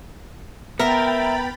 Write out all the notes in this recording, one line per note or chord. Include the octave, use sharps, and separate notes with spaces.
B3 A#4 E5 G5 B5 A6